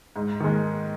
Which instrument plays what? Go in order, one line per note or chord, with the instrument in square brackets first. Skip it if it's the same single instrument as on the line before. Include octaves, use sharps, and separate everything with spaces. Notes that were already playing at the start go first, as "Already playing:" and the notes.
[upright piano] G#2
D#3 G#3